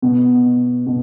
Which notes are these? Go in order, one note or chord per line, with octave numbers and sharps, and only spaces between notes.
B2
B2